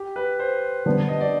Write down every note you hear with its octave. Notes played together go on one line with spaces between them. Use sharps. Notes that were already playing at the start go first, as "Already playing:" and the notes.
Already playing: G4
B4
C5
D3 G3 B3
D#5
D5